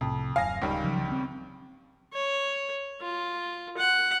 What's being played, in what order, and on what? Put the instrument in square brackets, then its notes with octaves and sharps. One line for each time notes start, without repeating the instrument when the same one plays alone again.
[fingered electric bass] C2 A2 C3 [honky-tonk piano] F2
[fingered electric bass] D#1 F#2 [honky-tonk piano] F5 G#5 A#6
[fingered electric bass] D1 [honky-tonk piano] C#2 D#3 G3
[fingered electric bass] C#3 F3 F#3
C4 C#4
[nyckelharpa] C#5
F4
F#5